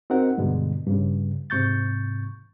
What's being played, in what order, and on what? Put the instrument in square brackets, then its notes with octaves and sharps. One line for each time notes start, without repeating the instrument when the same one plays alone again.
[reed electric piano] C4 D#4 F#4 A#4 F#5
G2 B2 D3 G#3
G2 C#3
G#2 C3 C#6 G6 A6